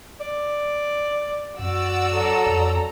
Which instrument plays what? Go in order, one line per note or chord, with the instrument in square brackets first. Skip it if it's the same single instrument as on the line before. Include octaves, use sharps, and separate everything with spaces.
[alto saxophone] D5
[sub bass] F#2 [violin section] F#4 D5 E6
[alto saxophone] F#3 [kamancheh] A4 A#5
[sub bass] F2